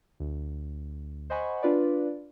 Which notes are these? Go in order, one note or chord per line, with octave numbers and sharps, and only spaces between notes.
D2
C5 D#5 F#5 G#5 B5 C#6
D4 F4 B4 D5